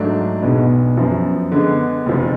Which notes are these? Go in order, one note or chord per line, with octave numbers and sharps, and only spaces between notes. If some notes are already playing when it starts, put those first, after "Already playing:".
Already playing: G#2 F#3 A3 D4
B1 B2 G#3 B3 D4
F#2 F3 B3
D3 G#3 B3
F1 F2 F3